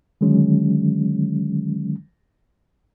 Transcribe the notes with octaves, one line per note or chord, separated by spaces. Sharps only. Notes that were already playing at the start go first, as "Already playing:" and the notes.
D3 D#3 F#3 G#3 C#4